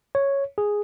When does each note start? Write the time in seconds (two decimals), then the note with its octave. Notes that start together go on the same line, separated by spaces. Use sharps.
0.15 C#5
0.58 G#4